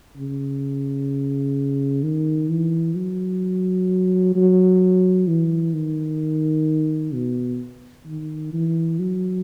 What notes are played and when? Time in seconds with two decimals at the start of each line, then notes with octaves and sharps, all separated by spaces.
0.17 C#3
2.03 D#3
2.49 E3
2.96 F#3
4.35 F#3
5.27 E3
5.74 D#3
7.14 B2
8.06 D#3
8.53 E3
8.99 F#3